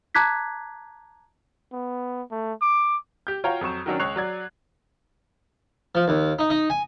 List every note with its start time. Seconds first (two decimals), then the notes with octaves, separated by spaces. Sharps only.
0.15 A5 A#5 D6 F#6 G#6 B6
1.73 B3
2.31 A3
2.62 D6
3.27 G4 G6
3.44 F4 F#4 C#5 F5 G5 A#5
3.61 F2 F#3 C#6 E7
3.86 D#3 F#3 C#4 D4
4.00 C#2 C#5 C#6 F#6 C7 F7
4.16 F#3 D5 G#6
5.95 F3
6.08 D#2
6.39 D#4
6.50 D#4
6.70 G#5